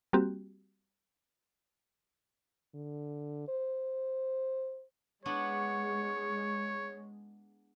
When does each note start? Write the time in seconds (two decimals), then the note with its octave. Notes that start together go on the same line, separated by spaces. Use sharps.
0.13 G3 A#3 C4 F#4 G4
2.75 D3
3.48 C5
5.26 G#3 B3 D4 E4 C#5 C#6